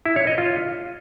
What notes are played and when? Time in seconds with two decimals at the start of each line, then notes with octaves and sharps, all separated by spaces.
0.06 E4
0.16 C#5
0.27 D#5
0.38 F4